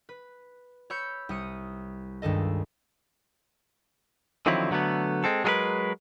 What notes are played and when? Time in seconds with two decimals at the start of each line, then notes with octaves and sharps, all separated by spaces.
0.09 B4
0.90 C#5 B5 E6 G6 C#7
1.29 C2 D#6 C#7 D#7
2.22 C#2 G2 D#3 A4 D#5
4.46 D3 D#3 F3 F#3 C4 E4
4.71 D3 F#3 A3 B3
5.24 G#3 C4 A4
5.44 F#3 G#3 D4 G#4 A#4 B4